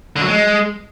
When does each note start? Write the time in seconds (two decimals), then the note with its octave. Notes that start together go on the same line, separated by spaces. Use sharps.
0.16 D3
0.22 F#3
0.28 G#3